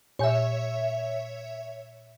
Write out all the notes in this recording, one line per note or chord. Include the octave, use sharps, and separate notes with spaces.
A#2 C#5 E5 G#5 G6